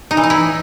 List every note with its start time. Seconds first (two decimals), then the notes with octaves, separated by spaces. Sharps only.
0.11 D#4
0.17 E3
0.24 D#4
0.30 E4